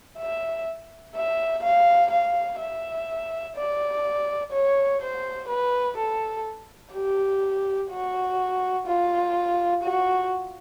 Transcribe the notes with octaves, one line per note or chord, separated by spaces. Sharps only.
E5
E5
F5
F5
E5
D5
C#5
C5
B4
A4
G4
F#4
F4
F#4